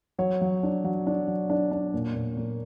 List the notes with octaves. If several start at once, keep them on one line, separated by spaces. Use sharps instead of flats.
F#3 C#5
F#3
D4
F#3
D4
F#3
D4
D4
A#2
A#2
A#3